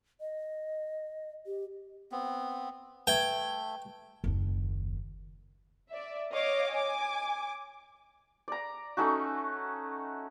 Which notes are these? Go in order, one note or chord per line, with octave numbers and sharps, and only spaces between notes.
D#5
G4
B3 C4
A3 B4 E5 G5 G#6
F#1 D#2
D5 E5
C#5 D#5 F5 D6
G#5 D6
D5 A#5
A3 C#4 D#4 F#4